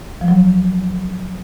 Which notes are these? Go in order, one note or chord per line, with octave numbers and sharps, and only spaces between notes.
F3
F#3